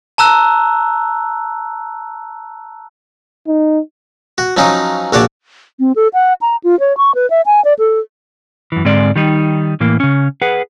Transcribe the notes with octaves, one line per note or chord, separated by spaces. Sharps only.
A5 A#5 E6 F#6
D#4
F#4
F3 F#3 C#4 D#4
A#1 F#4 C#5 D5 A5
C4
A4
F#5
A#5
F4
C#5
C#6
B4
E5
G#5
D5
A4
F#2 E3
G#2 D3 G#3 C4 D5
D#3 G3 D#4
A2 E3 A#3
C#3 C#4
G#4 B4 F#5